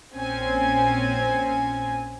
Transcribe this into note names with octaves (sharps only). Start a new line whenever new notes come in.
A#1 C4 C#4 G#5